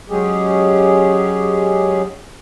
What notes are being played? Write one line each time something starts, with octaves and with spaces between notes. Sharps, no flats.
F#3 G#3 C#4 G4 G#4